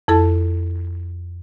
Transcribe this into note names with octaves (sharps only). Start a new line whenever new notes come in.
F2 E4 A4 A5